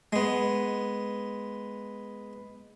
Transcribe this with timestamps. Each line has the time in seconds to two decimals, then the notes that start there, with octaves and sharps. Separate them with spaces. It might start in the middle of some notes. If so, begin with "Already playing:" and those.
0.13 G#3 B3